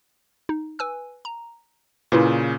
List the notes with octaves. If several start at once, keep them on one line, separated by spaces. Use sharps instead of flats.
D#4
B4 G#5 E6
A#5
A#2 C#3 E4 B4 C6